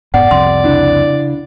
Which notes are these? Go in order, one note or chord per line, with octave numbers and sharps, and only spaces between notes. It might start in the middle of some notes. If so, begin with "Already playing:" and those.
F1 G#2 B3 D5 F#5
C2 F2 C3 C6
C#3 D4 E4